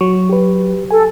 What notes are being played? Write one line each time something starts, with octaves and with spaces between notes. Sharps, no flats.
F#3 C#6
G4 B4
A4 G#5